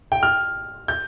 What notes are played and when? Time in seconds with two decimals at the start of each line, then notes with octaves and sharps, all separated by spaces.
0.12 G5
0.23 F6
0.88 G6